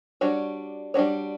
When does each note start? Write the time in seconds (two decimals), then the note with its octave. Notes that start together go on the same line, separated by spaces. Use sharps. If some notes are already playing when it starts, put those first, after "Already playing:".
0.21 G3 D4 F#4 C#5
0.94 G3 D4 F#4 C#5